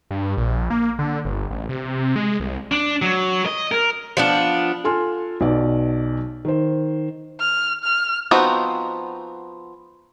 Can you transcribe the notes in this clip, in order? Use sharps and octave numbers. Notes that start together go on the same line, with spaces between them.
G2
A#1
A#3
D3
G1
A1
C3
G#3
C2
D4
F#3
D#5
A#4
F3 B3 D4
F4 A4 G#5 C6 F6
B1 B2 D5
D#3 C5
F6
F6
F3 B3 C4 D#4 F#4